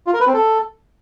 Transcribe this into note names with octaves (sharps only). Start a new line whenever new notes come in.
F4
A#4
B4
C4
A4